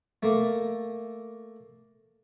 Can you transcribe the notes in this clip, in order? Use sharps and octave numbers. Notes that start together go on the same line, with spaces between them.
A3 A#3